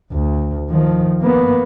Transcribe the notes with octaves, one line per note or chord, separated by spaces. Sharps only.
D2
D#3 F3
A#3 B3